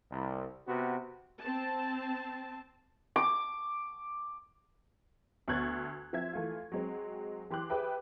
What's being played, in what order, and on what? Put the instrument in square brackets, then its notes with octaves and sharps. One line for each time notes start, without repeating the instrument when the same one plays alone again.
[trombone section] C2
C3 B3 F#4
[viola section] C4 A5
[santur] D6
[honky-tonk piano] D2 B3 C#6 F#6 G#6 A6
F3 C4 E5 G#6
E3 A3 F4
F#3 G#3 C4
E3 G4 C6 D6 F#6
G4 G#4 B4 E5 G5